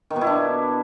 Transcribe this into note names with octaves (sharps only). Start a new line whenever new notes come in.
D#3
B2
E4
D4